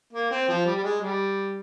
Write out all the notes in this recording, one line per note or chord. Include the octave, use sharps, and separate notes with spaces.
A#3
C4
F3
G3
G3
G#3
G3